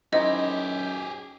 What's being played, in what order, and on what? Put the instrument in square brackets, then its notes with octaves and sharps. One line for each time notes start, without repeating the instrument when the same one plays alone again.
[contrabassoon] F#2 [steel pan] D#4 E4 C5 [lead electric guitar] G4 G#4 [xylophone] D#5